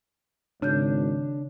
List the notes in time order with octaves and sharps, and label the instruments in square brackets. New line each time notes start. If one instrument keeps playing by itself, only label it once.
[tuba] G#1 [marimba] C#3 G6 [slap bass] D4